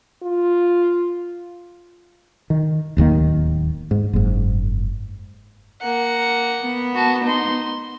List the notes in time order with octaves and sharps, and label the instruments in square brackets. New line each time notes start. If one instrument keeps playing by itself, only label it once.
[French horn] F4
[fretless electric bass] D#3
D1 D#2 D#3 A#3
G#2
F#1 G#2
[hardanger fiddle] A#3 F#5
[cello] B3
[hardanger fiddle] F#4 A5
D#4 C6